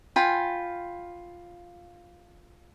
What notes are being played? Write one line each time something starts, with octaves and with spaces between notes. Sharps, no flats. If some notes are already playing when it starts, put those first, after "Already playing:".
F4 G5 G#5 B5